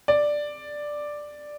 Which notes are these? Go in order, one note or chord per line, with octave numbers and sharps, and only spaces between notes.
D5